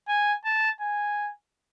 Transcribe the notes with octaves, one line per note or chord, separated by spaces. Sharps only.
G#5
A5
G#5